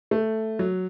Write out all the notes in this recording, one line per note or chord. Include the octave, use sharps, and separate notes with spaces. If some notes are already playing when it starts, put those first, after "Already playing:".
A3
F#3